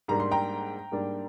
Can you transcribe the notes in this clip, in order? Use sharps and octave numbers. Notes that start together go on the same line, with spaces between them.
G#2 G3 A#3 D4 A#5
C6
G5 A#5
G#2 G3 A#3 D4